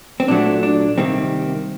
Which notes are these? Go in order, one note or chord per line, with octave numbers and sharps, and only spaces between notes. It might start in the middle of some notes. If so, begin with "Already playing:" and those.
C4
A#2 F#3 A3 D4
D4
C3 D#3 G3 A#3 C4